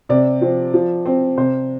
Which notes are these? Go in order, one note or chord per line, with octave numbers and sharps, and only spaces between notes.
C3 D5
F3 C4
F3
C4
C3 C5